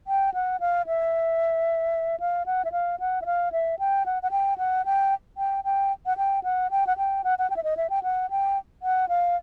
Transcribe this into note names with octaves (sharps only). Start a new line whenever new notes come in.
G5
F#5
F5
E5
F5
F#5
E5
F5
F#5
E5
F5
E5
G5
F#5
F#5
G5
F#5
G5
G5
G5
F#5
G5
F#5
G5
F#5
G5
F#5
F#5
G5
E5
D#5
E5
G5
F#5
G5
F#5
F5